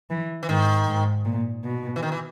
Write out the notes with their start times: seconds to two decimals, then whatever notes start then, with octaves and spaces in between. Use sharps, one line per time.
0.10 E3
0.43 E3
0.49 G#2 D#3
0.87 G#2
1.25 A#2
1.64 B2
1.96 E3
2.03 D#3
2.12 E3